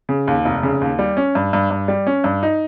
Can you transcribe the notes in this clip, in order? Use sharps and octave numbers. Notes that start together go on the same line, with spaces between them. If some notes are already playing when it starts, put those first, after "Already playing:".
C#3
D#2
F1
C#3
D#2
G3
C#4
G2
G2
G2
G3
C#4
G2
D#4